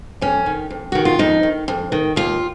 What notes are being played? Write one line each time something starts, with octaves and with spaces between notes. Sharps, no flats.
F2 C#4
D#3
F2
D#3 F#4
F4
F2 D#4
D#3
F2
D#3
D#2 F4